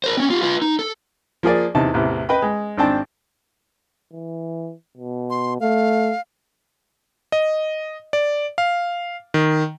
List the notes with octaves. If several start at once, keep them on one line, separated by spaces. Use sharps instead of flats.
A#4 C5
C4 C#4
F4 G4
F4 B4
D#4
A4
F3 A#3 G#4 D5
E2 C3 D#4 A5
A1 E2 C3
B4 D#5 G5 B5
G#3
G#1 C4 D4 G5 A5
E3
B2
C6
A3 F5
D#5
D5
F5
D#3